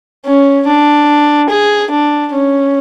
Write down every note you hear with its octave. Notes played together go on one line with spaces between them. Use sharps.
C#4
D4
G#4
D4
C#4